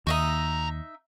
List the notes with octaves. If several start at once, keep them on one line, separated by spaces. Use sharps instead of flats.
D#2 D#4 F#4 D#5 E5 A#5